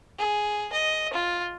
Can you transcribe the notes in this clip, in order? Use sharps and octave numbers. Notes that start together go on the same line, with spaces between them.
G#4
D#5
F4